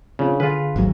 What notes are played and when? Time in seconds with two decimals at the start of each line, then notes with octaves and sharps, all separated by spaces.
0.19 C#3 C4 D4 F4
0.40 D3 F4 G#4 B4 F5
0.76 G#1 D2 F#3